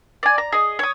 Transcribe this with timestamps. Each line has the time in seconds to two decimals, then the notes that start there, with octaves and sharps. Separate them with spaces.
0.23 D5 G#5
0.38 A#5
0.52 G#4 D#5
0.79 C#5 D#6